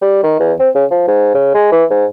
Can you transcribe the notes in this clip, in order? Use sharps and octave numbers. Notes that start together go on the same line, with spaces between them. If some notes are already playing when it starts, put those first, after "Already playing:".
G3
D#3
E2
C4
C#3
F3
G#2
C#3
G#3
E3
G#2